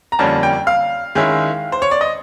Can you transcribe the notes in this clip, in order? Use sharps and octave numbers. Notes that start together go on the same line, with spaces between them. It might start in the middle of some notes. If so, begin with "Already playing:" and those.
A#5
F2 D3 G3 A#3 C#4 A5
G5
F5
D#3 G#3 C#4 E4
C5
C#5
D5
D#5